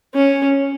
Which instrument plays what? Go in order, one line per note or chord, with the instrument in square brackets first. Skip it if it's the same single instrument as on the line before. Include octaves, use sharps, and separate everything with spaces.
[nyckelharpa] C#4